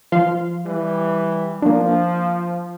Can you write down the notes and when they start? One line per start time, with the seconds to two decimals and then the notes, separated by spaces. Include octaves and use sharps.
0.12 F3 F5 C6
0.66 E3 G3
1.62 F3 A#3 D4